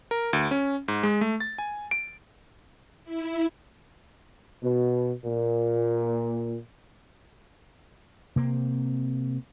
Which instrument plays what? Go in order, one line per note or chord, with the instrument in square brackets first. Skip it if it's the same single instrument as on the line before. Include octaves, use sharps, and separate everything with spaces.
[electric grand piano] A#4
D2
C#4
G#2
G#3
A3
A6
G#5
D7
[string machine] E4
[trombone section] B2
A#2
[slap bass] C3 A#3 C4